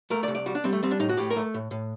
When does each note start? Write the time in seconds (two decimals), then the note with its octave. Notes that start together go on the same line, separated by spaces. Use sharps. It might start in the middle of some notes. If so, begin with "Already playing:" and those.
0.10 A3 A#4
0.23 D5
0.28 C2
0.35 D5
0.46 G3 F#4
0.55 D4
0.64 G3 C4
0.73 A3
0.83 G3 C4
0.91 D4
0.99 A2 D#4
1.09 F#4
1.17 A2 G4
1.30 A#4
1.36 A3
1.54 A2
1.71 A2